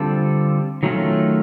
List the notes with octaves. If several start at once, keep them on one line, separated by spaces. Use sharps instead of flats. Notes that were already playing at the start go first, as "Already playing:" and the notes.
Already playing: D3 G3 C4 F4 A4
D#3 F#3 A3 C#4 F4